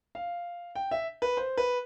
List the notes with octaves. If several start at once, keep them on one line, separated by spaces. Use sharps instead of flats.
F5
G5
E5
B4
C5
B4